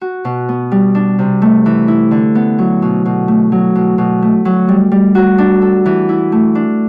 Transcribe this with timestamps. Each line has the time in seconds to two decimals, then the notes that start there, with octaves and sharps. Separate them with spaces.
0.01 F#4
0.25 B2
0.49 B3
0.72 G3
0.95 D4
1.19 C3
1.42 A3
1.66 E3
1.88 E4
2.11 D3
2.35 B3
2.59 F#3
2.82 B2
3.05 B2
3.28 A3
3.52 F#3
3.75 B2
3.98 B2
4.22 A3
4.45 F#3
4.69 G3
4.92 G3
5.15 F#4
5.38 D4
5.62 A4
5.86 E3
6.09 E4
6.32 A3
6.55 D4